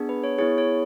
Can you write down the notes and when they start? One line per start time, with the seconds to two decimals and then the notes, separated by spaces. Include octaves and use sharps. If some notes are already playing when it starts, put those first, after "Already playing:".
Already playing: B3 D4 G#4
0.09 B4
0.24 C#5
0.38 B3 E4 G#4 C#5
0.58 C#5